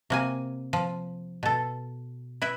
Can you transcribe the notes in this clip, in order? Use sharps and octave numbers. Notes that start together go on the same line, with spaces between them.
C3 A#3 G#5
F3
B2 A4
E4 B4 E5